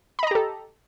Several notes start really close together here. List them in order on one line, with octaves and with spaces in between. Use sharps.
B5 D#5 A#5 G4 A4